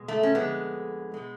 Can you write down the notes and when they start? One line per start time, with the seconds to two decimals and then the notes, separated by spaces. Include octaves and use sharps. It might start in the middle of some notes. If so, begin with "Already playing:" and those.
Already playing: B2 G#3
0.08 A3
0.23 C#4
0.35 F2 D3 G#3 B3
1.14 B2 G#3